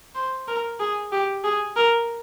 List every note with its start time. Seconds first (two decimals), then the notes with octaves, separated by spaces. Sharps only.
0.15 C5
0.48 A#4
0.80 G#4
1.12 G4
1.44 G#4
1.76 A#4